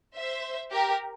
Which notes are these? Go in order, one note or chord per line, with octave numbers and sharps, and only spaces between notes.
C5 E5
G4 A#4